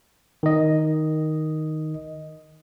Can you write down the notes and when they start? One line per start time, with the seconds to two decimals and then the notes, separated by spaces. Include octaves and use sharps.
0.43 D#3 D#5